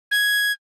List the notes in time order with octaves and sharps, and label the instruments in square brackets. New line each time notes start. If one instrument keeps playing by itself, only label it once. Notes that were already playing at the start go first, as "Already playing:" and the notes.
[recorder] G#6